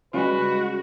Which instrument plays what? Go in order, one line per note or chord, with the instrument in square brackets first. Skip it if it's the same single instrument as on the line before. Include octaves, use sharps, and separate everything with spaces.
[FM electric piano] C#3 G3 G#3 [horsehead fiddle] F#4 [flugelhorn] B4